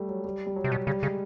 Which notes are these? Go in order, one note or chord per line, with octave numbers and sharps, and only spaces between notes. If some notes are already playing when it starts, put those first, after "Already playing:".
Already playing: G3 A3
F#3
G3
G3
F#3
C3
B2
C#3 G3
C#3 G#3